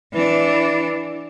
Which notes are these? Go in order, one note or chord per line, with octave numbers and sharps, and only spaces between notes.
E3 D4